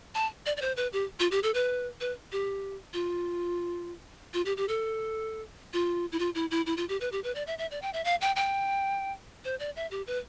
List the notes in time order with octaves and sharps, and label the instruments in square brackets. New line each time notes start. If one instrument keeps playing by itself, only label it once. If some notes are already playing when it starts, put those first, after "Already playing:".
[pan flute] A5
D5
D5
C5
B4
G4
F4
G4
A4
B4
B4
G4
F4
F4
G4
G4
A4
F4
E4
F4
E4
E4
E4
F4
G4
B4
G4
B4
D5
E5
E5
D5
G5
E5
F5
G5
G5
C5
D5
E5
G4
B4